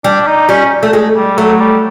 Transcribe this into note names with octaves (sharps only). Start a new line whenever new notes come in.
G3 D4
D#4
G3 C#4
A3
G#3
G3
F#3 A3
G3